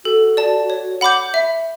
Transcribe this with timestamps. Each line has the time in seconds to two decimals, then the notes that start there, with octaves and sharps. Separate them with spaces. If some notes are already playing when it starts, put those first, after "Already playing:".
0.05 F#4 A4
0.37 D5 A5
0.70 C#5
1.01 F#5 B5 D6 G6
1.34 E5